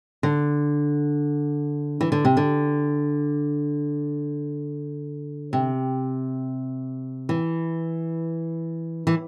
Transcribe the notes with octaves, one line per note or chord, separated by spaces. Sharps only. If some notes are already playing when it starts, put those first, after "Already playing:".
D3
E3
D3
C3
D3
C3
E3
E3